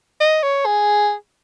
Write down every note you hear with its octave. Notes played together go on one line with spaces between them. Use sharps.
D#5
C#5
G#4